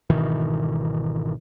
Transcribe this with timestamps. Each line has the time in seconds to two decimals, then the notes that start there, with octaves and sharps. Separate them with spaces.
0.10 G#1 B2 D#3 E3